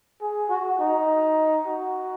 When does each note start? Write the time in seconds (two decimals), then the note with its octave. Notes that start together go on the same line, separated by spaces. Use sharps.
0.21 G#4
0.49 F#4
0.79 D#4
1.67 F#4